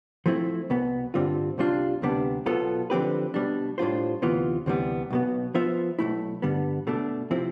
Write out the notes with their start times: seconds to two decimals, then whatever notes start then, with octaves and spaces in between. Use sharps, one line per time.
0.26 F3 A3 C4 E4
0.70 C2 B2 B3
1.14 G2 D3 G3 C4 F4
1.58 C2 C3 G3 D4 F4
2.02 D2 C3 G3 B3 D4
2.46 B1 B2 B3 F4 A4
2.90 D3 F3 C4 G4 B4
3.34 B2 G3 D4
3.78 A2 G3 D4 F4 C5
4.22 D2 C3 E3 B3 F4
4.66 D2 C3 E3 G3 B3
5.10 B1 B2 B3
5.54 F3 B3 F4 C5 E5
5.99 B1 B2 A3 E4
6.42 G2 D3 G3 B3
6.87 B2 A3 D4
7.31 C3 F3 C4 E4